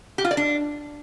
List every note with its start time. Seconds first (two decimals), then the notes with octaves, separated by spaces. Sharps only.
0.18 G4
0.24 F4
0.31 D5
0.37 D4